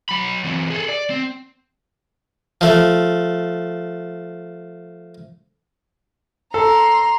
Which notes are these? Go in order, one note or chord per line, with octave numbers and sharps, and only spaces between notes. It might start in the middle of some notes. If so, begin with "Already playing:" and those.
F#3 B5
E3 C4
G#4 A4
D5
C4
F3 A3
A4 A#5 C6